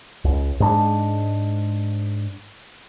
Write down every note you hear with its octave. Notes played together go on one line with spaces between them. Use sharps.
C#2
G#2 G#3 B3 D4